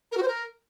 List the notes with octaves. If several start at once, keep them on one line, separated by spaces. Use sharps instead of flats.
A#4
F#4
C5
A#4